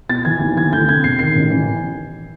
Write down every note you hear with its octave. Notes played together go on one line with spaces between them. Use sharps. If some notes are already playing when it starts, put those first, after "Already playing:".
B2 A6
E3 G#6
D#2
E3 G#6
D2 G6
C3 G#6
E1 C7
D#3 C7
A1
E3